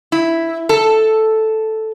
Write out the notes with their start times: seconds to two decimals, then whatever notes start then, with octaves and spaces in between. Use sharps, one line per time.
0.12 E4
0.69 A4